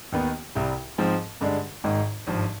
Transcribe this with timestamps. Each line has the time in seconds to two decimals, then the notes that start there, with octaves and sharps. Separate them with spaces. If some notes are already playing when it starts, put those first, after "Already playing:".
0.12 D#2 D#3 B3 D#4
0.55 C2 C3 G3
0.98 G#2 F3 C4
1.41 G2 D3 G#3 D4
1.84 G#1 G#2 D#3 G#3
2.27 G#1 G2 F3